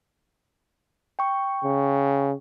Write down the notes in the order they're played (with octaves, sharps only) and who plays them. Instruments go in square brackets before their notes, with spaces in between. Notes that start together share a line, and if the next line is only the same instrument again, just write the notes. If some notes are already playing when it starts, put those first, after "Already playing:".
[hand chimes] G5 C#6
[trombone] C#3